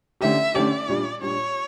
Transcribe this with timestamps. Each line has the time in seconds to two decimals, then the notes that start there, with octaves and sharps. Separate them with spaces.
0.21 D3 A3 C#4 G4 E5
0.54 D3 A3 C#4 G4 D5
0.88 A#2 G3 D4
1.21 A#2 G3 D4 C#5